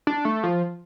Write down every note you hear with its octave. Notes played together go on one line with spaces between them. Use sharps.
D4
A3
F3